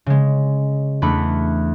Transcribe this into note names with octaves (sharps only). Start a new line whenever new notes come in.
C#3 G#3
E2 A3 D4 B5 C#7